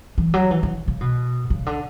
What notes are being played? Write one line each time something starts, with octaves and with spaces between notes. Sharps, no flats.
E3
F#3
E3
E3
C#3
B2
C#3
D3